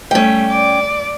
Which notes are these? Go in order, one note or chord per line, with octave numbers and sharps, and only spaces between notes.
G3 A3 C#4 G5
D5